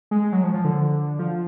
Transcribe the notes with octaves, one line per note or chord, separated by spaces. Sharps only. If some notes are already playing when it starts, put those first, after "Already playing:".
G#3
F#3
F3
F3
D3
F3